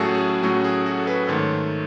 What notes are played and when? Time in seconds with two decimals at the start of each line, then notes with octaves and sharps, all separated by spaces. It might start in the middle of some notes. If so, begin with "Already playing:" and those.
Already playing: A2 F#3 A3 C#4 F#4 G#4 A4
0.15 G#4
0.43 A2 F#3 A3 C#4 F#4
0.64 G#4
0.86 F#4
0.98 A4
1.07 G#4 B4
1.27 G#2 D#3 A3 A4 C#5